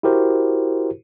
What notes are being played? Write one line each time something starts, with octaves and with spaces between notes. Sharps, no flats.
E4 F#4 G4 A#4 C5